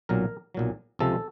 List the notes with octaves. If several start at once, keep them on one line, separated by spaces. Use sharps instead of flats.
B1 A#2 F#3 A#4
B1 A#2 F#3
C#2 C3 F3 G#3 A4